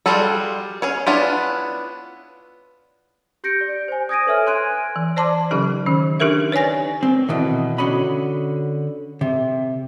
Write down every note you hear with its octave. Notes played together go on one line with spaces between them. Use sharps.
G3 F4 F#4 G#4 A4
C#4 G#4 C#5
B3 C#4 D4 E4 F4
G4 G6 A#6 C#7 D7
D5
C5 G#5
D#6 G#6 A#6 D7 D#7
A4 B4 C#5 E5 G#5 F6
G#5 C6 F#6 G#6 D7 D#7
E3
C5 D5 A5 C6 D6
C#3 F#3 C#4 D#4 G4 A4
D#3 C#4
D4 D#4 G4 A4 A#4 E5
B4 C#5 D5 G#5 A#6
C4
B2 D#3 E3
D3 C#4 F#4 D#5 B5
C3